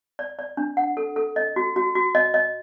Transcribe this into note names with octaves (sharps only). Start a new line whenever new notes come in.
D5
D5
D4
F#5
A4
A4
D#5
F#4
F#4
F#4
D#5
D#5